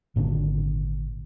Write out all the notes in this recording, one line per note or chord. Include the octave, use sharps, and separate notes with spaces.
G#1 A#2 D3